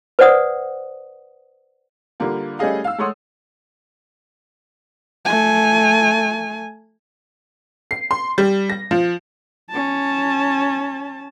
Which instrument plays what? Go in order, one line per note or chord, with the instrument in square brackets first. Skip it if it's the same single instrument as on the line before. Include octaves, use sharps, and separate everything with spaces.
[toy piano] B4 C5 D5 F#5 D#6
[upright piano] D3 G3 A#3 F4
G3 A3 C#4 G#4 D#5 F5
F5 E6
G#3 A3 C#5 F#5 C6 D#6
[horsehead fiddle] A3 G#5
[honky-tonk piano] C7
C6
G3
A#6
F3
[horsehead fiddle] C#4 A5